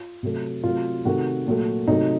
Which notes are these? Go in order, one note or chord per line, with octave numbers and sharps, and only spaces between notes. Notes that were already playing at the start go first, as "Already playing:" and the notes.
Already playing: F4
C3 F#3 A3
C3 F#3 A3 F4
C3 D#3 A3 F#4
A#2 F#3 A3
C3 F#3 A3 D#4